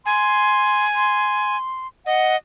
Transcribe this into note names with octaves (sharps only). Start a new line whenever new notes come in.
G#5 C6
C6
D#5 F#5